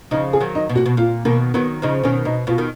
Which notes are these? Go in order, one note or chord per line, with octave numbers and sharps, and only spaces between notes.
C#3 F3 D#4
G#4
D#3 F#3
D#4
B2
A#2 F#4
B2
A#2 F4
B2 D#3 A#3
D#3 F#3 B3
C#3 F3 D#4
B2 D#3 C#4
B2 D#4
B2 F4
D#3